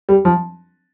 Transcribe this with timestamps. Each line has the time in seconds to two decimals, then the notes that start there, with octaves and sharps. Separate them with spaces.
0.09 G3
0.25 F3